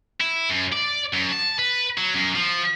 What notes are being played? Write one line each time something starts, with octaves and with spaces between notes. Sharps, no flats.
E4
F#2
D5
F#2
A5
B4
F#3
F#2
F3